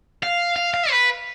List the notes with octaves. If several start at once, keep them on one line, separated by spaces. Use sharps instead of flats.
F5
F5
F5
B4